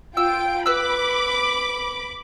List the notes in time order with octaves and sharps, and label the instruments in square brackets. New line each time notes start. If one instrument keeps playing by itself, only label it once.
[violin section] F4 G5 D7 [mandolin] E6
[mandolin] B4 E6 [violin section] B5 D6